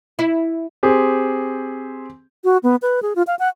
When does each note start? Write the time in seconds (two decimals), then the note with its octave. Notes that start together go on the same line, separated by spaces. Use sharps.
0.19 E4
0.83 C4 G4 G#4
2.44 F#4
2.63 B3
2.82 B4
3.02 G#4
3.16 F4
3.27 F5
3.39 F#5